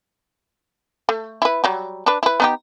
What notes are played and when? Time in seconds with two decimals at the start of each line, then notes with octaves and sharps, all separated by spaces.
1.09 A3
1.42 E4 B4
1.64 F#3 G3
2.06 D4 B4
2.23 E4 B4
2.40 B3 D#4 G4